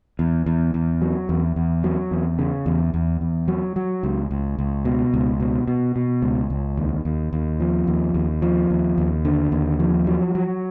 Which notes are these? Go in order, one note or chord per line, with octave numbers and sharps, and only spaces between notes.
E2
E2
E2
F#3
E2
E2
F#3
E2
C#3
E2
E2
E2
F#3
F#3
C#2
C#2
C#2
B2
C#2
B2
B2
B2
C#2
C#2
D#2
D#2
D#2
F3
D#2
D#2
F3
D#2
D#2
D3
D#2
F3
F#3
F#3